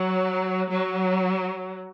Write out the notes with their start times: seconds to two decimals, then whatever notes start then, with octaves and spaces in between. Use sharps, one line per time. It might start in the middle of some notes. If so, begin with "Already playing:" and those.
Already playing: F#3
0.70 F#3